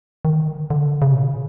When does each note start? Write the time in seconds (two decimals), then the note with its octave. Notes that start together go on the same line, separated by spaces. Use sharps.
0.25 D#3
0.48 D3
0.70 D3
1.02 C#3
1.11 B2
1.17 A#2